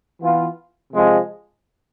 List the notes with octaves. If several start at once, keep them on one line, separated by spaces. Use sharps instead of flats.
E3 B3 F4
C3 F3 G#3